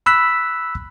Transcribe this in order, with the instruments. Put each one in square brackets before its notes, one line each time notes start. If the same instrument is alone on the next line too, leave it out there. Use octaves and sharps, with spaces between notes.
[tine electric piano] B5 E6 F#6 B6